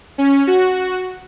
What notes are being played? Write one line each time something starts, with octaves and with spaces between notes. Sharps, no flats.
C#4
F#4